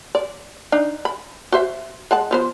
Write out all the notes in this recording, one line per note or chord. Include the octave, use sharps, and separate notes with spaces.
D5
D4 D#4
B5
F#4 C5 E5
G#3 F#5 A5
F3 B3 C5